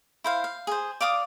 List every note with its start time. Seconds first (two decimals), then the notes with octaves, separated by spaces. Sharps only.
0.24 E4 C5 F5
0.44 F5
0.67 G#4 C5
1.01 D5 F5 D6 D#6